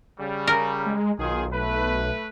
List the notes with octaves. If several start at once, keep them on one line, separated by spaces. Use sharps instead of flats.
C#3 G3
A#4
G#3
B1 D#3 F4 G#4
A3 B4